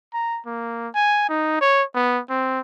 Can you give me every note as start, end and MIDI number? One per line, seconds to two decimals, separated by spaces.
0.14 0.40 82
0.46 0.88 58
0.94 1.25 80
1.29 1.57 63
1.61 1.83 73
1.95 2.20 59
2.29 2.60 60